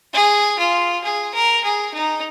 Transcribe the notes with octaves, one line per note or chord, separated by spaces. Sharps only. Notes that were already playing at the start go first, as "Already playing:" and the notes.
G#4
F4
G#4
A#4
G#4
D#4